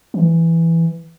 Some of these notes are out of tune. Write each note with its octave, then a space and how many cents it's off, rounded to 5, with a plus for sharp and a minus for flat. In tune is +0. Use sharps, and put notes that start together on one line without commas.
E3 +5